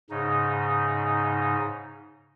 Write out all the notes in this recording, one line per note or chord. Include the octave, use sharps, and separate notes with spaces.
G#2 C#3 D#4